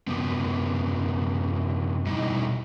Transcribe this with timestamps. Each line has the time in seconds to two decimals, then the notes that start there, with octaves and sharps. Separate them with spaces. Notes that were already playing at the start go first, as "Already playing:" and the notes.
0.07 F#2 C3 B3
2.06 B2 G3 D#4 E4